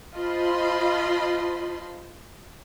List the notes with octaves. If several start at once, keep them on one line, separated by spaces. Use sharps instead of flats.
F4 C5 D#5 A5 B5 C6